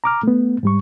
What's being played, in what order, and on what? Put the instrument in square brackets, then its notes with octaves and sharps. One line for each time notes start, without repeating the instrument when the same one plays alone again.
[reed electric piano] A#5 D6 F6
A3 B3
G#2 G3 C#6